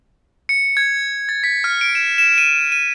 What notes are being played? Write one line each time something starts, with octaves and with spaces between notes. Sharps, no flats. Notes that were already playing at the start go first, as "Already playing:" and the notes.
C#7
G#6
A6
B6
F6
D7
E7
E7
D#7
D#7